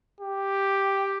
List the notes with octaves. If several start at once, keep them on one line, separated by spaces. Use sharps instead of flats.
G4